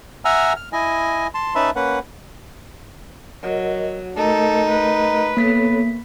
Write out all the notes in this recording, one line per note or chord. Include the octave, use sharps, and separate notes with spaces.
E5 F#5 G#5 A#5 E6 F6
F6
E4 D#5 G#5
A5 C6
C#4 D#4 B4 E5 A5 B5
A#3 C#4 B4 F#5
F#3 A#4 D#5
A3 D#4 A4 A#4 D#5
B4
A#3 B3 A4 C#5 B6